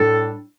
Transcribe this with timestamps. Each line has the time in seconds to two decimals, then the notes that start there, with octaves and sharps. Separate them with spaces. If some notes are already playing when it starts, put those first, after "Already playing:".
Already playing: A2 G3 D4 A4